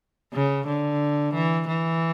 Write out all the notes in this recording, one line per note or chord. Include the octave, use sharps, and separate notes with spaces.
C#3
D3
E3
E3